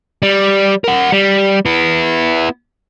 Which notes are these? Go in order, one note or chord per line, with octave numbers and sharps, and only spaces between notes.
G3
A#4 F#5
G3
B3 E4